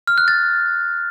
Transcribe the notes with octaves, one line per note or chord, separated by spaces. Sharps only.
F6
F#6
A6